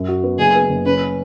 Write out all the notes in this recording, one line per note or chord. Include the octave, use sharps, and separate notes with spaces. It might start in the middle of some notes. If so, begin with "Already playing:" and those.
Already playing: F#2
F#4
B3
F#1 G#4
B3
F#1
C#4 B4